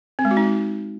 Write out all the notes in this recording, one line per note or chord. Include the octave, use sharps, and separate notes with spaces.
C4
G#3
F#4
D#4